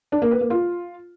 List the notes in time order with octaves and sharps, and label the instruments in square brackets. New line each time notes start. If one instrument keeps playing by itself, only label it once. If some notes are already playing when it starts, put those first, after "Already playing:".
[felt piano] D4
A#3
B4
A#3
F4